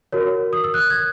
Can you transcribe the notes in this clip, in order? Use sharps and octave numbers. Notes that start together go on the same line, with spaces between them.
F#4 A#4 C#5
D#6
E6
F#6
G#6